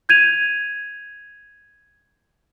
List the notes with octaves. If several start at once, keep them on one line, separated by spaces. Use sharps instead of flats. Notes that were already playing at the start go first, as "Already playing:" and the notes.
G6 G#6 D#7 F7